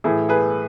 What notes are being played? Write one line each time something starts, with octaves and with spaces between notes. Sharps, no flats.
A2 E3 A3 E4 G#4
G#4 B4